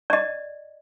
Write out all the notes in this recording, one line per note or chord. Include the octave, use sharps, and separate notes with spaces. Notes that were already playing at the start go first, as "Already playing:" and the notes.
D5 D#5